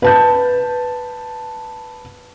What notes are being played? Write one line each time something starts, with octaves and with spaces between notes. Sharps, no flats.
B4 A5 G6